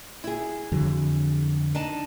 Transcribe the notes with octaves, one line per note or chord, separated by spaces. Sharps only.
E4 G#4
F2 D3 F#3
D4 D#4 A5